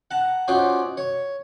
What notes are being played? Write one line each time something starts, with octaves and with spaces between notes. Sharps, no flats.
F#5 A5 A#5
C#4 D#4 F4 F#4 C5 D5
C#5